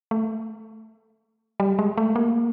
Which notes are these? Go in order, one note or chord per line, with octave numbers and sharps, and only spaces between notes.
A3
G3
G#3
A3
A#3